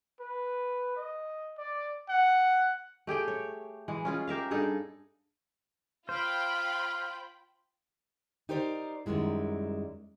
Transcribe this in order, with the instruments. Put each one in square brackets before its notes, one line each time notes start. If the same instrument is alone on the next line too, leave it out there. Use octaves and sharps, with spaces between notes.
[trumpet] B4
D#5
D5
F#5
[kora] A3 G4 G#4 G5
C#5
E3 G#3
C#4 F4 G#4
G4 A#4 E5 F5
G2 D#4 G#4 A4
[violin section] F4 G5 B5 [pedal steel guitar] C5 [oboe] F5
[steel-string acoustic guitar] D#4 G4 A#4 C5 D5
F#2 D#3 G3 G#3 E4